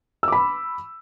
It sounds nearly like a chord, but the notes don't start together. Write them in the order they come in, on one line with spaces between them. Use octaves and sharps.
E6 D6 B5